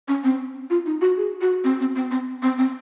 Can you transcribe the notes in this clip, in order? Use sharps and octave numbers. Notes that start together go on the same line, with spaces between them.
C#4
C4
F4
D#4
F#4
G#4
F#4
C4
C4
C4
C4
C4
C4